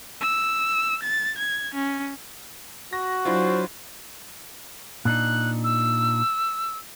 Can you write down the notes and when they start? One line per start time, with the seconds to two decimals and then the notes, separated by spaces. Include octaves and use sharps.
0.21 E6
1.03 A6
1.38 G#6
1.74 C#4
2.93 F#4 A#6
3.25 F#3 D4 E4 F4 C5
5.05 A#2 D4 D#4 F#6
5.64 E6